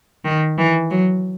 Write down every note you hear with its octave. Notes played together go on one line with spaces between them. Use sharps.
D#3
E3
F#3